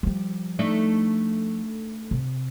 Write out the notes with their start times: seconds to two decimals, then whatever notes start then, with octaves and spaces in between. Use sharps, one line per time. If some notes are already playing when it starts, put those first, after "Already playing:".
0.03 F3 G3
0.59 A3 D4 D#4
2.11 C3